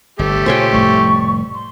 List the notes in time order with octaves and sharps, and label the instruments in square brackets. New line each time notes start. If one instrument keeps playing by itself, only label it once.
[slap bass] G1 [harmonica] A3 G4
[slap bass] A#2 C#3 [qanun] C5 C#5 G5 [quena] G#5
[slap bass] F1 A2 G3 [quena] C#6
[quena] C6